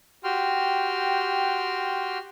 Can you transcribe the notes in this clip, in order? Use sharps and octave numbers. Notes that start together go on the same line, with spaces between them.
F#4 G4 G5 C6 F6